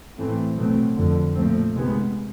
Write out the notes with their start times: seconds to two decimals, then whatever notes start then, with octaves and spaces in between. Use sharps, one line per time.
0.17 A2 E3 A3 C4
0.56 B2 F#3 A3 C4
0.96 F2 D3 F3
1.35 A#2 F3 A3 C4
1.75 C3 D#3 G#3 B3